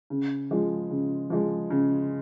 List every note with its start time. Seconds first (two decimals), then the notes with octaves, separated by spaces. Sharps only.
0.10 C#3
0.51 F3 G#3
0.91 C#3
1.30 F3 G#3
1.71 C#3